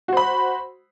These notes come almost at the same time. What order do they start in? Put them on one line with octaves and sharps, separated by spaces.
F#4 C5 B5